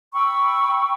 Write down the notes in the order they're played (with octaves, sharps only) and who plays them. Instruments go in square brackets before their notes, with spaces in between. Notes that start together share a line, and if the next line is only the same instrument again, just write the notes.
[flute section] G5 B5 C#6 E6